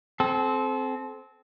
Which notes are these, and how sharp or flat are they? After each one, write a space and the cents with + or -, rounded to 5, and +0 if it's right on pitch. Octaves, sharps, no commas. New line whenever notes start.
C4 -5 A4 -30